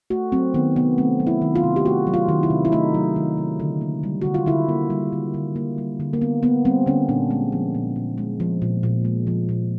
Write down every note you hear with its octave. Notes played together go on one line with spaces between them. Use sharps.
A3 F#4
F#3 C4
D#3 B3
C3 B3
A3 C4
F#3
E4
D#3
F4
C3
G4
A3 F#4
F#3
F4
D#3
E4
C3
E4
A3 D#4
F#3
D#3
C3
D3
A#3
G3
D3 F#4
F4
D3 E4
A#3
G3
D3
D3
A#3
G3
D3
A#3
D3 B3
A#3 B3
G3 C4
D3 C#4
A#2 D4
G#3
F3
A#2
A#2
G#3
F3
A#2
A#2
G#3
F3
A#2